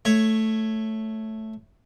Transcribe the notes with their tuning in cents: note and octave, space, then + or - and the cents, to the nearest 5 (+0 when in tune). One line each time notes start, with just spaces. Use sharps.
A3 +0 C#5 +0